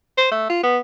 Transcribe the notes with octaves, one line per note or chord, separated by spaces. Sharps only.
C5
A3
F4
B3